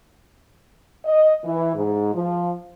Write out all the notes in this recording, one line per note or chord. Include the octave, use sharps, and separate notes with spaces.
D#5
E3
G#2
F3